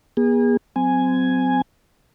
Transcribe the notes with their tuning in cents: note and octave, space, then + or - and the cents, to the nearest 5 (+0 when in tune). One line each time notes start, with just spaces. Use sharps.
B3 -45 G#4 -30
F#3 +0 C4 -25 G#5 +0